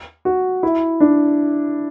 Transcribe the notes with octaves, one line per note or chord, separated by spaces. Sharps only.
F#4
E4
D4